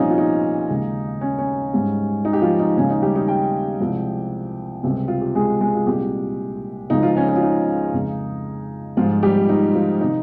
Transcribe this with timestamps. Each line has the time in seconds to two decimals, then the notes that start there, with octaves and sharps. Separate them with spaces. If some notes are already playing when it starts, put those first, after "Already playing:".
Already playing: C2 A#2 F3 G3 C#4 D#4 F4
0.10 F4
0.18 D#4
0.70 D#2 C#3 G#3
1.21 C#4
1.39 C#4
1.73 G#2 G3
2.25 D#4
2.33 G4
2.42 F3 F4
2.59 D#4
2.76 D#2 C#3 G#3 C#4
2.90 D#4
3.02 G3 G4
3.15 D#4 D#5
3.28 G4 G5
3.80 C2 C3 F3 G#3
4.83 C#2 C3 G3
5.08 F4
5.21 G4
5.35 G#3 G#4
5.61 G#3 G#4
5.75 F4
5.86 C2 A#2 G3 G#3 G4
6.90 C#2 C#3 F3 G#3 D#4
7.03 F3 F4
7.17 C#4
7.28 C#4
7.36 F4
7.42 D#4
7.94 F2 C#3 G#3
8.97 G#2 F3 G3 F4
9.23 G3 G4
9.49 D#4
9.74 F3 F4
10.01 C3 D#3 D#4